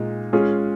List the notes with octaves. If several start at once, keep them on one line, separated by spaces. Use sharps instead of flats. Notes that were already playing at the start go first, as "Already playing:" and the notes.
Already playing: A#2 G#3 D#4 G#4
G#3 C#4 F4 G#4